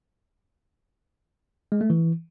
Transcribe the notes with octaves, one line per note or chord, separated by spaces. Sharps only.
G#3
A3
E3